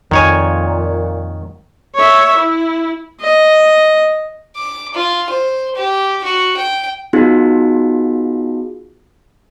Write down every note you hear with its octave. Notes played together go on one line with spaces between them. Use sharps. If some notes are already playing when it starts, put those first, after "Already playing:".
F2 A#2 D#3 C#5 G#5
C#5 E5
E4
D#5
D6
F4
C5
G4
F#4
G5
B3 D#4 F4 F#4 G#4